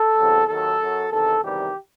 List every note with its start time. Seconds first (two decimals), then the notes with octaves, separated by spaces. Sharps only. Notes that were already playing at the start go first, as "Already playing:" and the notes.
Already playing: A4
0.17 E2 C3 F#3
0.48 D#2 D#3 F#3 A4
0.80 F#2 F#3
1.11 E2 C3 D#3 A4
1.43 E2 C3 D#3 G3 G4